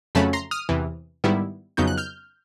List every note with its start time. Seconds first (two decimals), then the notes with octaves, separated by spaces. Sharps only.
0.15 F2 C#3 F#3 A3 C#4 A5 B5
0.33 A#5 C6
0.51 D#6 F6
0.69 E2 C3 E3
1.24 G#2 D#3 G3 B3 E4
1.77 F2 C#3 F#3 B3 D#4 G6
1.88 F#6
1.98 F6 G6